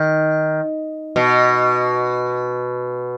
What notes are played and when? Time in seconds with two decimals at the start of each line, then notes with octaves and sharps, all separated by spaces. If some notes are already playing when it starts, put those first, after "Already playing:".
Already playing: D#3
1.16 B2